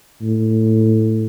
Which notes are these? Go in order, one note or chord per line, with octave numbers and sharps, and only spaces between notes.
A2